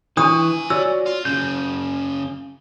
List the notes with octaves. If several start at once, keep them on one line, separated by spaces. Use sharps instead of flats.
E3 D4 F4 G#5 C#6 D#6
F#4 C#5 D5 E6
F4
F#2 C#3 G6